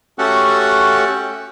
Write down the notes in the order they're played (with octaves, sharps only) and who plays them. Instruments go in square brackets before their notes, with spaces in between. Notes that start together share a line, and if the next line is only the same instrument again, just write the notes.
[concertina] A3 C#4 F#4 G4 A4 F#5